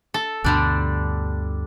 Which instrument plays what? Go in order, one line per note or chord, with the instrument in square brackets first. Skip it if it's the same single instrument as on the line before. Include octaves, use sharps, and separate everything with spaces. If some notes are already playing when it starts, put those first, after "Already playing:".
[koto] A4
[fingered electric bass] D2 G2 B2 [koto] D3 G3 D4